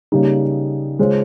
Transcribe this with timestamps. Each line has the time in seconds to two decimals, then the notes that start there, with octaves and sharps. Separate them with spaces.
0.12 C#3 G3 A#3 D#4 G4
0.99 C#3 G#3 C#4 F4 C5